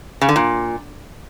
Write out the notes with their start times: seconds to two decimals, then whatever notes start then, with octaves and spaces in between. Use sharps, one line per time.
0.21 C#3
0.29 D3
0.36 A#2